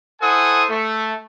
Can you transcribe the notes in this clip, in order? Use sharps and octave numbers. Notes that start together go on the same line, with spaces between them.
E4 A4 C5 F#5 G#5 D#6
A3